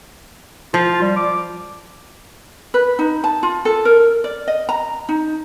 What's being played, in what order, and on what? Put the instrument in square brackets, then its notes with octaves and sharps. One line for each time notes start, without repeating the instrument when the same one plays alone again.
[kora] F3 [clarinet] F4
[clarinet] G3
D6
[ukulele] B4
D#4
A5
F4
A4
A#4
D5
D#5
A#5
D#4